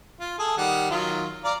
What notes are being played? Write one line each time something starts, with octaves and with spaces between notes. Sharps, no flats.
F4
G#4 A4
D#3 G3 F#5
D#3 F#3 F4
D5 F5 A#5